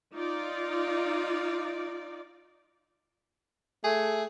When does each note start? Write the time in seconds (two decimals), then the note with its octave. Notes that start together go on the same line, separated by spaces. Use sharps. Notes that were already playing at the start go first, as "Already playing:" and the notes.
0.16 D#4 F4 D5
3.84 A3 G#4